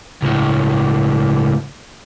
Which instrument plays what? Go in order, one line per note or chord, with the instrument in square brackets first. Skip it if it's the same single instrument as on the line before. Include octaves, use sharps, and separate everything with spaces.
[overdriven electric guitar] C#2 A2